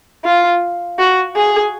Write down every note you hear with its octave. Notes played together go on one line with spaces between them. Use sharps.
F4
F#4
G#4